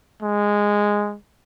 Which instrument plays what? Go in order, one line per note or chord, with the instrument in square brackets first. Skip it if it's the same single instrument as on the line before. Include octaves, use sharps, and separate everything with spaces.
[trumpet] G#3